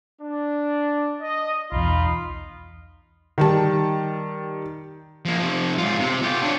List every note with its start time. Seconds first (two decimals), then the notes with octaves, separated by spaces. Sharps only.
0.21 D4
1.21 D#5
1.72 B1 E2 D#4 F4 B5
3.38 D#3 G3 A5
5.25 F3 A#3
5.37 C3 F3
5.78 G#2 F4
5.99 C3
6.23 F4 G4
6.42 D4 C#5